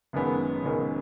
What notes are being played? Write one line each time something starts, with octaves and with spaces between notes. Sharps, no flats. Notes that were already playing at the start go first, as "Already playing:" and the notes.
F#1 F#2 D#3 G#3 B3
F#1 F#2 D#3 G#3 B3